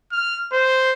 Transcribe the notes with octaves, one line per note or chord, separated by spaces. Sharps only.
F6
C5